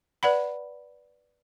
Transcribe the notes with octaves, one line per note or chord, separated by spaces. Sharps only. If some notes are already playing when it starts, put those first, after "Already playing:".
B4 D5 F#5 B5